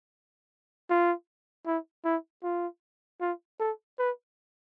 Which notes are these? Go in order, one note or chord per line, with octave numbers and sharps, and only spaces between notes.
F4
E4
E4
F4
F4
A4
B4